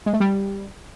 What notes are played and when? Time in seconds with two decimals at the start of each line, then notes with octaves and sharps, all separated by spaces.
0.06 G#3
0.13 A3
0.20 G3